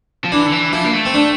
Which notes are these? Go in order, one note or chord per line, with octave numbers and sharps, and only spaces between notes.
F3
E3 D4
D3
E3
F3 E4
A#3
A3
C4
D4